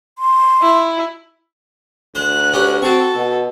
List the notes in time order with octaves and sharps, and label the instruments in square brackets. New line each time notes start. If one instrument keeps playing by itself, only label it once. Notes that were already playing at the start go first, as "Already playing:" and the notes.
[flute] C6
[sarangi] E4
[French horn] D2 [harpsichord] C5 [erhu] F#6
[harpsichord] B3 C#4 G4
[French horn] C4 [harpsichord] F#4 C#6 [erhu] A4
[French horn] B2